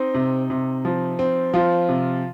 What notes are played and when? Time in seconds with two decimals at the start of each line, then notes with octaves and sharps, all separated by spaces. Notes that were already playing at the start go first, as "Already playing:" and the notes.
Already playing: C4 D#4
0.14 C3
0.50 C3
0.85 F3
1.19 C4
1.54 F3 F4
1.89 C3